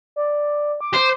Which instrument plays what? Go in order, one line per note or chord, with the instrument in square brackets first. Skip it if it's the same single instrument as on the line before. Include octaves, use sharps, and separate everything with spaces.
[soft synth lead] D5
D6
[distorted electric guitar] C5